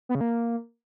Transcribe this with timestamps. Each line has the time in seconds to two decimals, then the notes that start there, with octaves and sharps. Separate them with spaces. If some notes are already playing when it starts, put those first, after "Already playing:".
0.09 B3
0.15 C#3
0.21 A#3